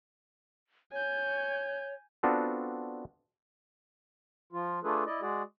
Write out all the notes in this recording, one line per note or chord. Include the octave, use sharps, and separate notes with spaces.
C#5 G#5 G6
B3 C4 D4 F4 F#4 A4
F3 F4
A3 D4 F4 G#4 A4 B4
E4 D5 D#5
G#3 F#4 G#4 D5